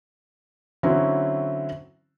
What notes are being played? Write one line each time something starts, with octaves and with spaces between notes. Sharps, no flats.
D3 F#3 C4 C#4 E4